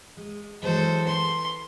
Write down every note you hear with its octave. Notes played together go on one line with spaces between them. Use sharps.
G#3
E3 F#3 G#3 A4 C5
B4 C6